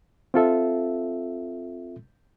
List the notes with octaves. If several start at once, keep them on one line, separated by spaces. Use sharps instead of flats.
C4 F4 A4 E5